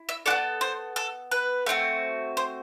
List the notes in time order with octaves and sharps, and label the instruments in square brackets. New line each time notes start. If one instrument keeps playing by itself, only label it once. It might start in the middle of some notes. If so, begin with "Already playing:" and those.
Already playing: [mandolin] E4
E5
F#4 A4 D5
B3
C5
A4
B4
A3 C4 F#4
C5